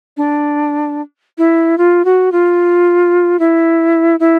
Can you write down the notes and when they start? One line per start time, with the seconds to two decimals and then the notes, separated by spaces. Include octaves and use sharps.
0.17 D4
1.38 E4
1.78 F4
2.05 F#4
2.32 F4
3.39 E4
4.20 E4